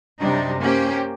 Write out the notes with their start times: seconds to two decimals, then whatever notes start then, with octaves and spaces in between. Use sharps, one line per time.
0.20 F#2 C3 G3 D4 D#4
0.61 A#3 C#4 G4 C5